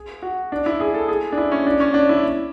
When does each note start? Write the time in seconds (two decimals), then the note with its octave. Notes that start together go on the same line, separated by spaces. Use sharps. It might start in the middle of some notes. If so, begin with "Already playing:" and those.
Already playing: G#4
0.22 F#4
0.52 D4
0.66 E4
0.80 G#4
0.94 A4
1.08 G#4
1.32 D4
1.38 E4
1.51 C#4
1.66 D4
1.80 C#4
1.94 D4
2.09 E4